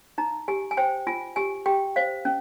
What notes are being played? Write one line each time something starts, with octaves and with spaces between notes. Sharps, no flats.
D#4 A#5
G4 G#5
G#5
C5 G5
F4 G#5
G4 G#5
G4 G5
C5 F5
C#4